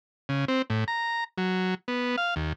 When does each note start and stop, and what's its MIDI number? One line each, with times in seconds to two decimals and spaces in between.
0.29 0.45 49
0.48 0.62 60
0.70 0.84 45
0.88 1.24 82
1.38 1.75 54
1.88 2.16 59
2.18 2.34 77
2.36 2.53 39